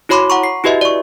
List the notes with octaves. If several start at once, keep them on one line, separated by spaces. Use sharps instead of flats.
E4 F#4 C#5 B5 C6 D6
F#5 A#5 C#6
C7
E4 F#4 G4 B4 D#5 E5
D5 C#6